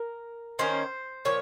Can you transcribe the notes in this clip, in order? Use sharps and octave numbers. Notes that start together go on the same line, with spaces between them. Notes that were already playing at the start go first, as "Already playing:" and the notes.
Already playing: A#4
D#3 A#3 C#4 C5
A#2 F3 C#5